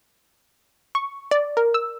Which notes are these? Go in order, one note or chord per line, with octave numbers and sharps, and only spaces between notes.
C#6
D5
A#4
E6